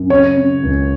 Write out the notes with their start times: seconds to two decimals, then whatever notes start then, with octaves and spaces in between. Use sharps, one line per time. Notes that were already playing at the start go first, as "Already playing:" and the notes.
Already playing: F#2
0.10 C#3 C#5
0.37 C#3
0.63 C#2